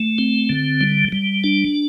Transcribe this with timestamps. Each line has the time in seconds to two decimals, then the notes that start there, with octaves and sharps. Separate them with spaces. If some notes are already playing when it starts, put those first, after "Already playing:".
Already playing: A3
0.18 C4
0.49 D3
0.81 G3
1.12 G3
1.44 D4